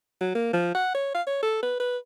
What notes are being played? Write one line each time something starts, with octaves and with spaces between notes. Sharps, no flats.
F#3
A#3
F3
F#5
C#5
F5
C#5
A4
B4
B4